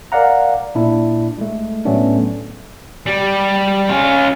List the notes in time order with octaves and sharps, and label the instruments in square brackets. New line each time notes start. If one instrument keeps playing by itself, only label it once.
[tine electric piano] A#4 D5 F5 F#5 A#5
A#2 D4 E4
G#3 A3
A2 F#3 A3 B3 C#4 D4
[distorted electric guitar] G3
C#4 F4